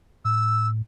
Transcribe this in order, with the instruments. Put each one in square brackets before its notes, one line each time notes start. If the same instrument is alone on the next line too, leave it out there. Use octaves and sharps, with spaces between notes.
[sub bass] A2 [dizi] E6